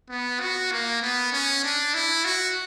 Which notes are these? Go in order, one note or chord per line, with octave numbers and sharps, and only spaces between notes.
B3
F#4
A#3
B3
C#4
D4
E4
F#4